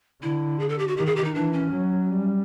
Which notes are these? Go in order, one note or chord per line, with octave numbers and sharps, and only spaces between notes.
D3 E4
G#4
A4
G4
F#4
D#3 G4
G#4
G4
D#4
E3 D4
C#4
F#3
G3